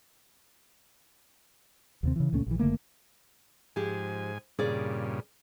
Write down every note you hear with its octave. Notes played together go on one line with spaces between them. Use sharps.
D#2 C3 C4
C#3 E3
C#2 A#2 A3 C#4
A#1 E3
F#1 D3 A3 A#3
G#2 F3 G4 G#4 G#5
G2 A#2 C#3 G#4 D5